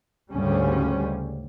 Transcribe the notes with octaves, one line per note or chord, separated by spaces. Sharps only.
D2 G#2 C#3 G3 C#4